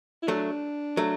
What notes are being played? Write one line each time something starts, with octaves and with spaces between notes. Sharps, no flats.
E4
F#3 A3 D4
F#3 A3